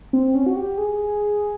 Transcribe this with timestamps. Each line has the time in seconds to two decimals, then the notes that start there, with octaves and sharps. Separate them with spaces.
0.13 C4
0.35 C#4
0.46 F#4
0.56 G4
0.78 G#4